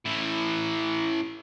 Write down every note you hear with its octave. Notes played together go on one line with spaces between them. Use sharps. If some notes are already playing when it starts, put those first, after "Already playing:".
A2 E3